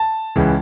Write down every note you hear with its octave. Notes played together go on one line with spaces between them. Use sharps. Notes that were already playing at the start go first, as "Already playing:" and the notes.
Already playing: A5
C#2 C#3 E3